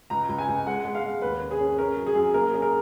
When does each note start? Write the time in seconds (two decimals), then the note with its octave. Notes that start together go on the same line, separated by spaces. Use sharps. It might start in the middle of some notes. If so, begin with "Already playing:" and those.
0.10 C#2 A#5
0.29 C#2
0.38 G#5
0.48 C#2
0.67 G#3 F#5
0.85 G#3
0.95 F5
1.04 G#3
1.22 D#2 B4
1.42 C#4
1.51 G#4
1.60 C#4
1.78 C#4 A#4
1.97 F#3
2.06 G#4
2.15 F#2
2.34 A#3 A#4
2.53 C#4 G#4
2.62 A#4